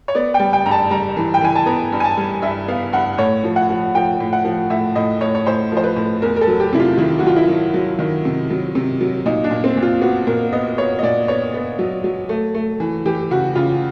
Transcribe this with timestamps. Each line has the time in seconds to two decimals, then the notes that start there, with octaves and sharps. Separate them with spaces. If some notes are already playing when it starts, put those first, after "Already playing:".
0.08 C#5
0.15 B3 D5
0.34 G5
0.39 G3
0.53 G5
0.66 G2 A#5
0.71 A5
0.91 G3 A#5
1.17 E3
1.34 G5
1.41 E3 G#5
1.55 A5
1.66 B3 A#5
1.92 G2
2.00 G#5
2.04 A5
2.17 G3
2.42 G2 E5
2.68 B3 F5
2.93 G2 F#5
3.18 A2 C#5
3.44 F3
3.56 F#5
3.69 F3
3.95 F3 G5
4.20 A2
4.33 F#5
4.45 F3
4.70 A2 E5
4.95 A2 D#5
5.21 A2 C#5
5.35 C#5
5.46 A2 C5
5.72 F3
5.77 C5
5.84 B4
5.96 A2
6.22 E2 A#4
6.36 A#4
6.41 A4
6.48 F#3
6.60 G4
6.73 C3 E4
6.80 F4
6.97 D#3 E4
7.19 F#4
7.23 F#3 F4
7.36 E4
7.48 F#3
7.74 F#3
7.99 D#3
8.25 C3
8.50 F#3
8.75 C3
9.01 F#3
9.26 A#2 D#4
9.44 D4
9.51 A#2
9.64 C4
9.77 A#2
9.82 F4
10.01 B3 F#4
10.27 A#2 A#4
10.52 B3 D#5
10.78 B3 C#5
10.99 D#5
11.03 A#2 D5
11.28 B3 C#5
11.54 B3
11.79 F#3
12.04 F#3
12.29 A3
12.55 A3
12.80 E3
13.05 E3 G4
13.31 C#3 F#4
13.55 C#3 F4